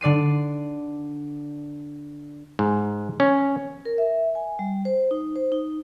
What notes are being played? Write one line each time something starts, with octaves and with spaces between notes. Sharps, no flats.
D3 D5 C7 D#7
G#2
C#4
A#4
E5
G#5
G3
C5
D#4
C5
D#4